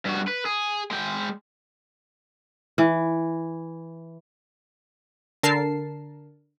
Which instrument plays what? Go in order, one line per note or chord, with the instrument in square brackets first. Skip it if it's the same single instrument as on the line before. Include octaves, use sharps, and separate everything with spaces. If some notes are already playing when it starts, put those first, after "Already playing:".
[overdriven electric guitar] G2 F#4
B4
G#4
G#3 G5
[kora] E3
[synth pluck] D3 A#4 A5 C7